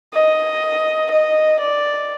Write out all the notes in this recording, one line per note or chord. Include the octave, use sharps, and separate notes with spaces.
D#5
D#5
D5